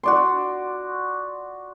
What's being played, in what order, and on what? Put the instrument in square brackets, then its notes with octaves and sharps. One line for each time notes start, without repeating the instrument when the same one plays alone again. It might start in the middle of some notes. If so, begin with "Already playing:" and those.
[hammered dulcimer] F#4 D5 C6